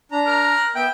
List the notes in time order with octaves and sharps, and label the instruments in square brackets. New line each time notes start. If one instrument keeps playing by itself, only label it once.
[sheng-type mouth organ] D4 A#5
[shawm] A#4
[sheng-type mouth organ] F#6
[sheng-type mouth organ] B3 E5 [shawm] G5